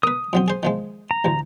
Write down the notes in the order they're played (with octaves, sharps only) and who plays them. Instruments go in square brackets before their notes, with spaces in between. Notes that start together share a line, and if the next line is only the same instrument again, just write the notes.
[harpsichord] A#4 B4 [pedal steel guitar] D#6
[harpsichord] F2 F#3 C4
G#4 C5
D#3 F3 G#3
[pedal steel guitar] A#5
[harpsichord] A1 D2